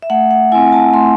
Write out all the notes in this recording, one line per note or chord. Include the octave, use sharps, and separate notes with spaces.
E5
A3 F#5
F#5
C4 E4 G#5
A5
A3 C6